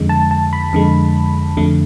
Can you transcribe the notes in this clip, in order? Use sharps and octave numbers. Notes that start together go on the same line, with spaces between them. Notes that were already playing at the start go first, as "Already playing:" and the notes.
Already playing: F2 D3 G#3
A5
A5
B5
F2 D3 G#3
F2 D3 A3